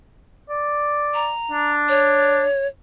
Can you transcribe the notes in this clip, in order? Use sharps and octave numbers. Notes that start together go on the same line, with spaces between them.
D5
A#5
D4
C#5